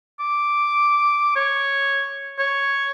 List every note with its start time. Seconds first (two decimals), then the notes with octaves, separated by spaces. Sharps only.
0.19 D6
1.35 C#5
2.38 C#5